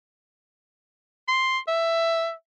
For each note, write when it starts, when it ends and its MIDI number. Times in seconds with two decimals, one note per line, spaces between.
1.28 1.59 84
1.68 2.32 76